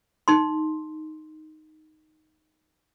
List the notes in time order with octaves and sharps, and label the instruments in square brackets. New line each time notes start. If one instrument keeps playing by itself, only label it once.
[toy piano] D#4 C6